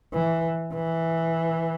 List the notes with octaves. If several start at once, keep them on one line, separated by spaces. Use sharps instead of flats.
E3
E3